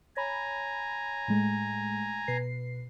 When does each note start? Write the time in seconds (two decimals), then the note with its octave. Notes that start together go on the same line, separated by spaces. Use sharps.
0.17 C#5 G#5 A#5 B5
1.28 A2 G#3 A3
2.28 B2 B4 C7